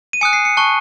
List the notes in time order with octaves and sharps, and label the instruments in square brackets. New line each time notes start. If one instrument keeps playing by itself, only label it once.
[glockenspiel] D#7
G#5 D#6 F#6 C#7
C7
C#7
A5 C#6 F#6